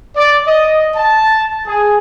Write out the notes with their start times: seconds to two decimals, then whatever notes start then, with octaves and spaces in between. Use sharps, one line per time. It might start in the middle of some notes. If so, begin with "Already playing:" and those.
0.16 D5
0.47 D#5
0.96 A5
1.67 G#4